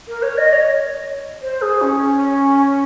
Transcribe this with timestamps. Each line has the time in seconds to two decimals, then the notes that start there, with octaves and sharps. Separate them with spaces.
0.08 A#4
0.23 C#5
0.38 D#5
0.53 C#5
1.42 C5
1.62 G#4
1.82 C#4